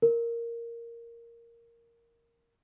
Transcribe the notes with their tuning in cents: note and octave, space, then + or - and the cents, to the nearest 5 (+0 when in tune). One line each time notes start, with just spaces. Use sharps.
A#4 +0